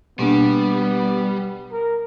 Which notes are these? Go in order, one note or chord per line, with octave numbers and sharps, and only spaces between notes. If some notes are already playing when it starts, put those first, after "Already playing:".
B2 G3 A#3 B3 D4
A#4